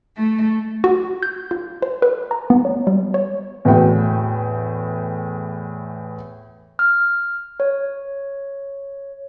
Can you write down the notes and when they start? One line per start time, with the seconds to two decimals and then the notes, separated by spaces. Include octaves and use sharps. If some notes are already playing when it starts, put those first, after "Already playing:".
0.16 A3
0.84 F#4
1.23 G6
1.51 F4
1.82 C5
2.02 B4
2.31 A#5
2.50 B3
2.65 C#5
2.87 G3
3.14 C#5
3.65 E2 A2 E3 F#4 G5
6.79 F6
7.60 C#5